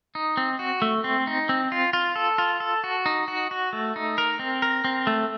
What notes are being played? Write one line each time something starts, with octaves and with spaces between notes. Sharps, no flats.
D#4
C4
F#4
A3
C4
D#4
C4
F4
F4
A4
F4
A4
F#4
D#4
F#4
F#4
A3
D#4
A#4
C4
A#4
C4
A3